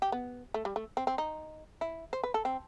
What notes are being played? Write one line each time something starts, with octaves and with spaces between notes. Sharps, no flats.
G4
B3
A3
G3
A3
C4
C4
D#4
E4
C5
B4
A4
C4